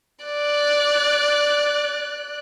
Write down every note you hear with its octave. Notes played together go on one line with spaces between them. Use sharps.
D5 F#6